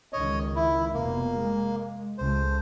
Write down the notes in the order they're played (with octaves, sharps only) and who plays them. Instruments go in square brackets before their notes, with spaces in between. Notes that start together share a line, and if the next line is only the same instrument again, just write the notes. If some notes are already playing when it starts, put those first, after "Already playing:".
[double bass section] C#2 D#3 [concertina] C#5 D#5
[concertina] E4
[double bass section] F1 B2 [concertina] A#3
[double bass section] G#3
[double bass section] C#2 A3 [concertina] C5